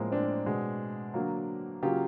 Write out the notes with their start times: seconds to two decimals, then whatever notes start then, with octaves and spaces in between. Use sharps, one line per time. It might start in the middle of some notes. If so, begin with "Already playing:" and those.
Already playing: A2 F3 G#3 A#3 C4
0.12 C4 D4
0.46 B2 G#3
1.14 D3 F#3 A#3
1.83 C#3 F#3 A#3 F4 G4